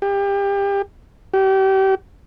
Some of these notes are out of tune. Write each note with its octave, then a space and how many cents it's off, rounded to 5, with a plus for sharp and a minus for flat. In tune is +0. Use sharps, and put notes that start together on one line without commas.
G4 +30
G4 -30